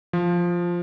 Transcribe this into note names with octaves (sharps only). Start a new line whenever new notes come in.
F3